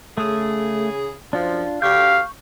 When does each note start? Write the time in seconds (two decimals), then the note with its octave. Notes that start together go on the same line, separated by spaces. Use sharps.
0.18 C#3 A3 G#4
1.33 F#2 F3 D4 F4
1.82 D2 D3 G4 F5 C#6 G6